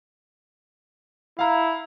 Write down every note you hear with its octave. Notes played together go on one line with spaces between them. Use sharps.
E4 F5 A#5